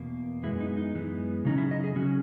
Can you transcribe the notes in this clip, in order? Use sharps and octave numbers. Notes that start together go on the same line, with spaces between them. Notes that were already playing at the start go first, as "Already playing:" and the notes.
Already playing: E2 B2 A#3
F#2 E3 G#3 B3 E4
D#4
D#4
F#2 E3 G#3 B3
C#3 F#3 C#4 D#4
E4
D#5
G#4
C#3 F#3 C#4 F#4